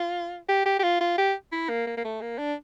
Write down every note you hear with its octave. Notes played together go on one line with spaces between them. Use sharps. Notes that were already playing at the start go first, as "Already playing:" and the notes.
Already playing: F4
G4
G4
G4
F4
F4
G4
E4
A#3
A#3
A#3
A3
A#3
D4